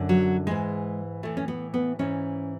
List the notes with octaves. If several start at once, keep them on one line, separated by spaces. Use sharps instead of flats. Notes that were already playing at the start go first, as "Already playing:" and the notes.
Already playing: F#2 D3
F#3
G#2 E3 G#3
A2 E3 A3
C#4
B3
B3
G#2 E3 C#4